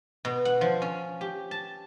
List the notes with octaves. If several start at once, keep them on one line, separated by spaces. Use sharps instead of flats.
B2
F#5
F3
C#4
G4
A5